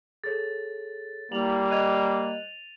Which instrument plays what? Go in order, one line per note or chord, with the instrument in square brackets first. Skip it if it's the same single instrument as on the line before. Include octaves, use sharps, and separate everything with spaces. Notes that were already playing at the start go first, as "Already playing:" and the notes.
[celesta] G#4 A4 C#5 [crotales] A6
[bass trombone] G3 [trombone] A#3 [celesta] E4 F7 [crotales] F#7
[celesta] D#5 F#6 G#6 [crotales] D#7 F7